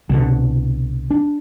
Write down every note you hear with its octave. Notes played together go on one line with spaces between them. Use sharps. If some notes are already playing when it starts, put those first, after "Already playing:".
C2 B2 D3
D4